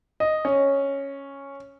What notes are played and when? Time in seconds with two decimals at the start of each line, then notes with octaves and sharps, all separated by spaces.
0.20 D#5
0.45 C#4